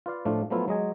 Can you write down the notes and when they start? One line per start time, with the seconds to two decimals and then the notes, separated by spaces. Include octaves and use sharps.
0.06 F4 B4 D5 F5
0.25 A2 F3 A3 D4 F4
0.50 F3 F#3 A3 B3 E4 F4
0.68 F#3 G#3 D#5 G#5